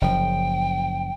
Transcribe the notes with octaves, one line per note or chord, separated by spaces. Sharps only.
F#1 F3 G5